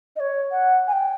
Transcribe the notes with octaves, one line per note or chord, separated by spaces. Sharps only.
D#5
C#5
F#5
G#5
G5